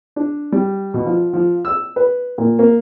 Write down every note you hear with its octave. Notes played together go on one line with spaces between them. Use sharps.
D4
G3
B2
F3
F3
E6
B4
A#2
A#3